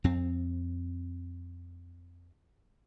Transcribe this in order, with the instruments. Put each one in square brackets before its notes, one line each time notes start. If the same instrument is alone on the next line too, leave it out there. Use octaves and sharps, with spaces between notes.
[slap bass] F2 C4